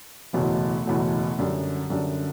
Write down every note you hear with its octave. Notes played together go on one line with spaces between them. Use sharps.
F#1 E2 B2 F#3 A3
F#1 E2 B2 F#3 A3
F#2 D3 G3
F#2 D3 G3